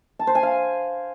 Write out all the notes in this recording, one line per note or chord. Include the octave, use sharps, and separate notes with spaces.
A5
C5
G#5
F5